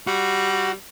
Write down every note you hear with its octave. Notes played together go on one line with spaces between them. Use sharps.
G3 F#4